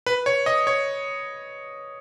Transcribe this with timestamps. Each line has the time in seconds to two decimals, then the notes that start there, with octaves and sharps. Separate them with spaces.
0.06 B4
0.26 C#5
0.46 D#5
0.67 C#5